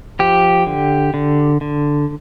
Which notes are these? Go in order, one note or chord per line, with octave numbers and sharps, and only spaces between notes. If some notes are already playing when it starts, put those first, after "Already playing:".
F3 G4
D3
D3
D3